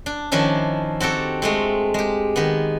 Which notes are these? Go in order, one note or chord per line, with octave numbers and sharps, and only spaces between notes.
D4
D#3 F3 C#4 D4 E4
C4 F#4 G4 A4
G#3 A3 C4
G#3 G4
D#3 B3